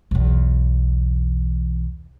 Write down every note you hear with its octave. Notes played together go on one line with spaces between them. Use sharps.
B1 E2